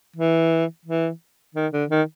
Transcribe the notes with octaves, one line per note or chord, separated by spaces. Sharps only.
E3
E3
D#3
D3
D#3